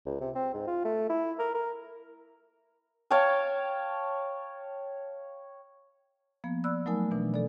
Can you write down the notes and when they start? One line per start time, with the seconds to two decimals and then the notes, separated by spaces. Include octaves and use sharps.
0.06 C#2
0.21 C3
0.35 C4
0.54 G#2
0.67 F4
0.85 A3
1.10 E4
1.39 A#4
1.54 A#4
3.10 C#5 F5 G5 A5
6.44 F3 A#3 B3
6.64 D5 B5 E6 F#6
6.86 F#3 A3 D#4 A#4 G#5
7.11 B2 E3 D4
7.34 A4 D5